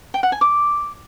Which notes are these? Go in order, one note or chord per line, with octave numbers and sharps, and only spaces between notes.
G5
F#5
G#5
D6